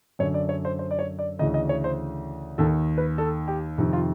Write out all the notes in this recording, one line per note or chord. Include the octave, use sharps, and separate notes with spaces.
F#2 D3 C#5
D5
C#5
C5
C5
D5
C#5
D5
D2 C#3 E3 D#5
D#5
C#5
C5
D#2 D#3 A4
B4
A4
G4
F2 C3 D#3
F4